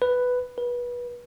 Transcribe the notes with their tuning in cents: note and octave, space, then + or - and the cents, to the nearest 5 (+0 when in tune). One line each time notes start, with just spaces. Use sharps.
B4 +5
B4 -25